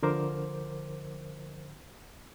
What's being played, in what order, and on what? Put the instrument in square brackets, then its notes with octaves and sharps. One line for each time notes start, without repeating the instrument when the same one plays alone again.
[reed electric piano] D3 F3 A#4 C5 D6